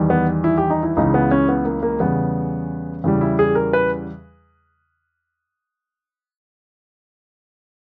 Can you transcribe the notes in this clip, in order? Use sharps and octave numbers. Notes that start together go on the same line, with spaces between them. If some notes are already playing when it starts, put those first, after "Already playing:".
Already playing: E2 D#3 G3
B3
E4
G4
D#4
E4
C#2 C#3 E3 D#4
B3
C#4
B3
A#3
A#3
E2 C#3 G3 B3
E2 C#3 E3 G3
E4
G#4
A#4
B4